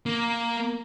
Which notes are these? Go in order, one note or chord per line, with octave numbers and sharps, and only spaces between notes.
A#3